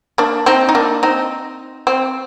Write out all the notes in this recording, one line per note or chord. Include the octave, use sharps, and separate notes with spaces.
A#3 D4
C4 D#4
D#4
A#3 D4
C4 D#4
C4